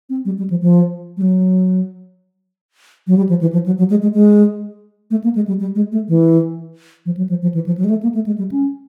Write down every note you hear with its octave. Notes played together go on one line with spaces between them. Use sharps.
C4
G3
G3
F3
F3
G3
F#3
F#3
G3
F3
E3
F3
F#3
F#3
G#3
G#3
G#3
A3
A#3
G#3
G3
G3
G#3
A3
E3
F3
F#3
F3
F3
E3
F3
F#3
G#3
A3
A#3
A3
G#3
G3
C#4